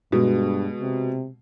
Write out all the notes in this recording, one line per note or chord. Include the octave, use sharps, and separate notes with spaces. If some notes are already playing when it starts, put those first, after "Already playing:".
G2 B2 G#3
C3